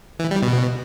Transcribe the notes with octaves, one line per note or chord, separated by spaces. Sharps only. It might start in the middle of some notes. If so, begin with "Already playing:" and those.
E3
G3
B2